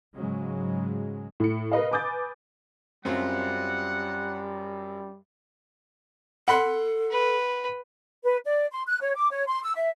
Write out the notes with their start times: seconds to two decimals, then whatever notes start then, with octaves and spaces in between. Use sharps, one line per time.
0.16 G#2 C#3 F#3 G#3
1.40 A2 C#7
1.72 A#4 B4 D#5 F5
1.91 B4 G#5 D6 D#6 G6 A6
3.05 F#2 G3 C4 C#4 F4 F#5
6.48 A4 F#5 B5 C6
7.11 B4
8.24 B4
8.45 D5
8.72 C6
8.87 F#6
9.01 C#5
9.16 D6
9.30 C#5
9.47 C6
9.63 E6
9.76 E5